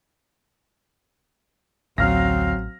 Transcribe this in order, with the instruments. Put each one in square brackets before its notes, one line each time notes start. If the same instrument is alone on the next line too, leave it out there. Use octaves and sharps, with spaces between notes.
[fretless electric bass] A1 [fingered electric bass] D2 [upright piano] F#3 F6 A#6 [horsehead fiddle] C4 F5